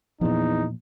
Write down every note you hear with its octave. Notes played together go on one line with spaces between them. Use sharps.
E2 A#2 F3 D#4